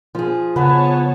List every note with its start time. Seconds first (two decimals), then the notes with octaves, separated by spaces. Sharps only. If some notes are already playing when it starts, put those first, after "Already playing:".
0.15 F3 G#4
0.56 C#3 B3 B4 C#5 F#5 A5